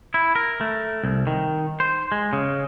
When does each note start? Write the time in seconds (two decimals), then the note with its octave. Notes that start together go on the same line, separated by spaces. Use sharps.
0.14 E4
0.35 A#4
0.61 A3
1.04 C2
1.27 D#3
1.80 C5
2.12 G#3
2.33 C#3